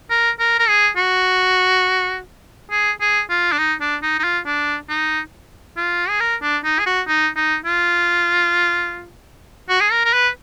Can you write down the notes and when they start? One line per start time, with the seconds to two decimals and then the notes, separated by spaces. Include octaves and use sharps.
0.10 A#4
0.39 A#4
0.59 A#4
0.69 G#4
0.97 F#4
2.71 G#4
3.01 G#4
3.30 F4
3.52 D4
3.59 D#4
3.81 D4
4.02 D#4
4.19 D#4
4.24 F4
4.46 D4
4.89 D#4
5.77 F4
6.09 G#4
6.20 A#4
6.42 D4
6.64 D#4
6.79 G#4
6.86 F#4
7.07 D#4
7.36 D#4
7.66 F4
9.69 F#4
9.81 G#4
9.91 A#4
10.05 A#4
10.13 B4